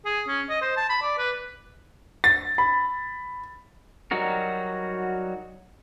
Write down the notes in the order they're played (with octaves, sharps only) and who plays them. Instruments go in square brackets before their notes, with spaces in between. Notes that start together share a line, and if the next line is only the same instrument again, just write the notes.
[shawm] G#4
C#4
D#5
C5
A5
B5
D5
B4
[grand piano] A6
B5
[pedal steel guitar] F#3 G3 D#4 F#4 A#4